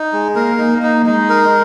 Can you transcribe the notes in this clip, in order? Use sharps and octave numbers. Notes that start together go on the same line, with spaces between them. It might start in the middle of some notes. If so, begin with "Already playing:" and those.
Already playing: D#4
G#3
A#3 A#4
D#4
A#3
D#4
G#3 D#4
A#4